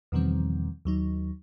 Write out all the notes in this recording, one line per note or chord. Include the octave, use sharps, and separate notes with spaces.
E2 B2 D#3 F3 G3 C4
D#2 F#3 D#4